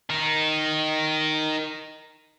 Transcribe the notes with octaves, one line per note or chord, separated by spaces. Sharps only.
D#3 D#4